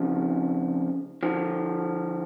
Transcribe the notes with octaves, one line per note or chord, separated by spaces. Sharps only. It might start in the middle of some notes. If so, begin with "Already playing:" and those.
Already playing: F2 C#3 F3
D3 F3